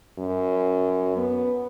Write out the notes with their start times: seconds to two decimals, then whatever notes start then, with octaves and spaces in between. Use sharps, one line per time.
0.18 F#2
1.17 B3